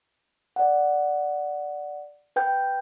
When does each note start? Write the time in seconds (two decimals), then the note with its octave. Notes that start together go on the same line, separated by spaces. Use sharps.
0.56 D5 F#5
2.36 B4 G5 G6